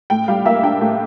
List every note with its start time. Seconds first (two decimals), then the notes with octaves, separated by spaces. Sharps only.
0.10 A2 G5
0.28 G3 F5
0.45 A#3 E5
0.63 D4 G5
0.81 A2